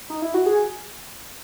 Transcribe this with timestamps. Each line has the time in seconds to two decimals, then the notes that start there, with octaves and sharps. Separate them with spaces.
0.10 D#4
0.22 E4
0.34 F#4
0.46 G#4